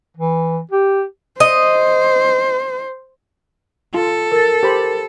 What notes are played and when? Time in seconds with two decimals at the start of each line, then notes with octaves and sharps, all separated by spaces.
0.17 E3
0.71 G4
1.40 C5 D#5
3.94 F4 A4
4.32 A#4 A6
4.63 G4 C5 B5